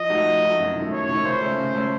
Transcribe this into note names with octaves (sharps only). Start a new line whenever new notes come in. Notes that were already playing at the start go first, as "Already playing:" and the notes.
Already playing: F3 D#5
A3 D#4 F#4
F3
A3 D#4 F#4
F#2
D#3 A3
F#2 C#5
D#3 A3
C#3 C5
A3 C#4
C#3
A3 C#4